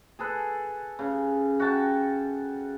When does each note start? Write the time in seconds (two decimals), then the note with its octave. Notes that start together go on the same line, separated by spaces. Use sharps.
0.19 G#4 A4 B4
0.99 C#3
1.60 F#4 G5 A5